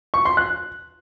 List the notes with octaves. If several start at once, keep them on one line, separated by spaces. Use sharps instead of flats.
C#6
C6
F#6